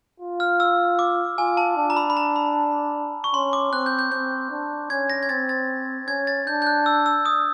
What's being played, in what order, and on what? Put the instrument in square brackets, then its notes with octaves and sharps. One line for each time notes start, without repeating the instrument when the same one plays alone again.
[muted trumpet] F4
[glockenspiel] F6
E6
D6
[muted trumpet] F4 [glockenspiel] G#5
[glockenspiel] A5
[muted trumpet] D4
[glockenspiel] A#5
B5
B5
A#5
B5
C#6
[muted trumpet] C#4 [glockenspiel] C6
[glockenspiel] D6
[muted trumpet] C4 [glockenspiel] F#6
[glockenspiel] G6
G6
[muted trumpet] C4 [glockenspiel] G6
[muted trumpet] D4
[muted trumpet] C#4 [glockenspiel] G#6
[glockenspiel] A#6
G#6
[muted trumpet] C4 [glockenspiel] A6
[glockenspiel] A6
[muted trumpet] C#4 [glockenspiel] G#6
[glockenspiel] A6
[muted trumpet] D4 [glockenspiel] G6
[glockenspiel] G6
F#6
E6
E6
D#6